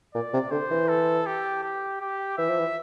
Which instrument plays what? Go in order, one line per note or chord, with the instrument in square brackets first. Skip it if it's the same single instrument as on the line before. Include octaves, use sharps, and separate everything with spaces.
[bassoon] A#2 [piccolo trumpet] D5
[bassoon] C3
[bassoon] D3 [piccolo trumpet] C5
[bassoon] E3
[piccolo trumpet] A4
G4
G4
G4
[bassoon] E3 [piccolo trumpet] E5
[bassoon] F3
E3